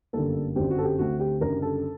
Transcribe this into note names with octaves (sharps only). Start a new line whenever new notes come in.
G1 F#2 D3 G3 A#3 A4
G1 F#2 F#3 C4 G4
F#4
A4
G4
D2 D3 A3 C4 F#4
G4
F#1 F#2 D3 G3 A#4
A4